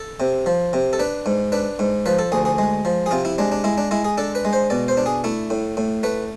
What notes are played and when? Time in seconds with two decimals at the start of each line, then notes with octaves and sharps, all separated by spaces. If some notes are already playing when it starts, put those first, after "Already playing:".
Already playing: A4
0.20 C3
0.46 F3
0.73 C3
0.93 A4
0.99 D4 B4
1.26 G#2
1.52 D4 B4
1.79 G#2
2.06 F3 B4
2.19 A4
2.32 D2 G#4
2.45 G#4
2.58 G#3
2.85 F3
3.06 G#4
3.11 C3 F4
3.25 E4
3.38 G#3 D4
3.52 D4
3.64 G#3 E4
3.78 D4
3.91 G#3 E4
4.05 G#4
4.17 D4 A4
4.35 B4
4.45 G#3
4.53 C5
4.70 B2 D5
4.88 C5
4.97 D4
5.06 G#4
5.24 A3 E4
5.50 A2
5.77 A2
6.03 A3 B4